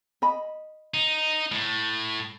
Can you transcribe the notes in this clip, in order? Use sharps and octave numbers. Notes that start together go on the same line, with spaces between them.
D#5 B5
D#4
A2